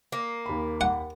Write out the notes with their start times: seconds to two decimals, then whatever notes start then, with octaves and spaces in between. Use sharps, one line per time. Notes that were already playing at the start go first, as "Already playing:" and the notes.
0.12 A#3
0.46 D#2 B5
0.81 F#5